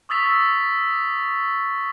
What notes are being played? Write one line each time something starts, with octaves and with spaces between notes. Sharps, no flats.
C#6 D#6 E6 A6 B6 F7